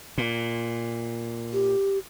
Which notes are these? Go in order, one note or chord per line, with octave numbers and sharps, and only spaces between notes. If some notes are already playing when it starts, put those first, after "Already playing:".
A#2
G4